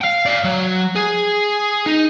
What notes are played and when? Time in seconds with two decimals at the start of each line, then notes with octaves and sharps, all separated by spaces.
0.02 F5 G5
0.26 D5 F5
0.44 F#3
0.95 G#4
1.86 D#4